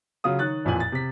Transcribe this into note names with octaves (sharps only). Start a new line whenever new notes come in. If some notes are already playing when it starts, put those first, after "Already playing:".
C#3 F#3 F4 D#6
D#3 C#5 F#6 A6
A1 F2 A#2 G#5 F#7
A6
C3 B6